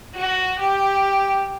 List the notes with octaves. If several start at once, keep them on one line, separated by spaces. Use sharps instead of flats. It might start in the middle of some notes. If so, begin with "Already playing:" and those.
F#4
G4